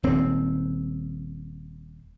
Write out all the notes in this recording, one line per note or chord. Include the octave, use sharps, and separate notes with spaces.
D#1 C4